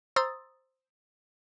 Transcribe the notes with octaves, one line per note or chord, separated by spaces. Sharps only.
C5 A#5 C6 D#6 E6 A6